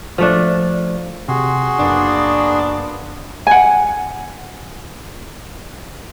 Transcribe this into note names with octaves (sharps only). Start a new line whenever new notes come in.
F3 A3 D4
C3 F#4 G#4 C6
F#1 A#3 B3 D4
F#5 G#5